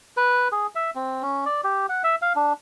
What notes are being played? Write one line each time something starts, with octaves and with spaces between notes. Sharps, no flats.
B4
G#4
E5
C4
C#4
D5
G4
F#5
E5
F5
D4